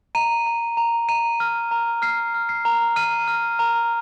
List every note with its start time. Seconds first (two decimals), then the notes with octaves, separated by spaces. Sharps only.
0.15 A#5 D#7
0.46 A#5
0.77 A#5
1.09 A#5 D#7
1.40 F6
1.71 A#5
2.02 F6 C7
2.34 F6
2.49 C7
2.65 A#5
2.96 F6 D#7
3.28 F6
3.59 A#5